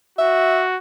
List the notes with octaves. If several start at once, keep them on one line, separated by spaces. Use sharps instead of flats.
F#4 E5